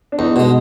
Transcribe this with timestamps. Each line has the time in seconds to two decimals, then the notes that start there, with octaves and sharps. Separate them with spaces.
0.12 D4
0.18 E2 D#4
0.36 B2 G#3